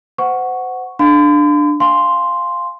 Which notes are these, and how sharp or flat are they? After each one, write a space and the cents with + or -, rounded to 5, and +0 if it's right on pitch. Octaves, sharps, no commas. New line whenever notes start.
C5 -30 F#5 +0 C#6 +0
D4 +10 F5 +0 C6 -45
F5 +0 G#5 +0 C6 +0